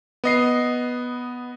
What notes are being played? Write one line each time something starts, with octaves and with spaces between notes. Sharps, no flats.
B3 D#5 C7